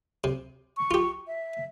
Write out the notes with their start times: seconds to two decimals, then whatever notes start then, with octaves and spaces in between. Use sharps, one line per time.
0.24 C3
0.77 C#6
0.91 F4 G4
1.27 E5